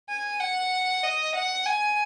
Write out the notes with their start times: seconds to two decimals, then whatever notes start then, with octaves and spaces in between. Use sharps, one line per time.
0.09 G#5
0.40 F#5
1.03 D#5
1.35 F#5
1.65 G#5